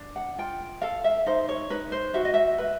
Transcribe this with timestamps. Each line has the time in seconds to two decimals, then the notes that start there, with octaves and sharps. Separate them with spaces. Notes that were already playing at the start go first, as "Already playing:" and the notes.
Already playing: D4
0.16 F#5
0.38 F4 G5
0.82 A4 F5
1.04 E5
1.26 D#4 C5
1.49 C#5
1.70 D#4 B4
1.92 C5
2.14 F#4 E5
2.25 D#5
2.34 E5
2.58 B4